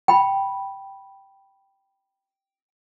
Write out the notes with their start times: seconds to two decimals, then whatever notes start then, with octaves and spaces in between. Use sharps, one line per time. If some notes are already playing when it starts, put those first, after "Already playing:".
0.08 G5 B5